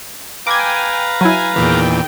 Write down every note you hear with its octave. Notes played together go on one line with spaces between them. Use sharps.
B4 F5 G5 G#5 A#5 D6 G#6
F#3 E4 G#5
E2 A#2 D#3 E3 G#4 G5